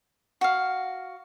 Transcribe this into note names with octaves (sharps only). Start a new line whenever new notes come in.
F#4 F5